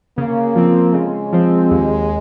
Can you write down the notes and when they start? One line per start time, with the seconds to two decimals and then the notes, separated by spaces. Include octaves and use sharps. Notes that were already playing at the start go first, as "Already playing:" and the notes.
0.18 C#3 A#3
0.56 F3 C4
0.94 C#3 G#3
1.33 F3 C4
1.71 D#2